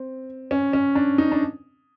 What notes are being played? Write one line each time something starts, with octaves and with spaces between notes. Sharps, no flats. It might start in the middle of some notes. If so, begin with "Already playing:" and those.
Already playing: C4
C#4
C#4
D4
D#4
D4